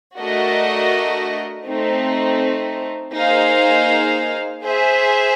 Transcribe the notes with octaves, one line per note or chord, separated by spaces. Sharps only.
A3 D4 F#4 A#4 D#5
A3 C4 D#4
A#3 D#4 G#4 C5 F5
G#4 C5 E5